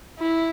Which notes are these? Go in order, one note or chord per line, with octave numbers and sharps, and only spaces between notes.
E4